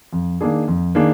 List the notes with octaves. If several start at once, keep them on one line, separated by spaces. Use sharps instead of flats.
F2
D#3 A#3 D4 G#4
F2
D#3 A#3 D4 G#4